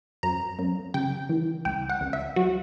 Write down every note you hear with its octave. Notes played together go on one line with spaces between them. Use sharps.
F#2 A#5
F#2
C#3 G5
E3
C#2 G5
F#5
C#2
E5
F#3 F#4